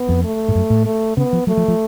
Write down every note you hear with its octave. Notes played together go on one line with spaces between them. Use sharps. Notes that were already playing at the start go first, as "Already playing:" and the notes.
Already playing: B3
F2
A3
G#2
F#2
A2
A3
C#3 B3
F3
F#3 A3
F3
F3